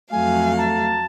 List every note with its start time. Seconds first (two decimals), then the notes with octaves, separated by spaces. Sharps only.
0.12 F2 F#3 A3 F5 G#5
0.57 A5 A#5